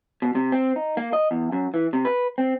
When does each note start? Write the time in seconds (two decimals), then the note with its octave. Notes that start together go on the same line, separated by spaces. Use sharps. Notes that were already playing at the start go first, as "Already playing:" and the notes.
0.22 B2
0.35 C3
0.52 C4
0.76 D#4
0.97 A#3
1.13 D#5
1.31 E2
1.52 F#2
1.74 E3
1.93 C3
2.05 B4
2.38 C4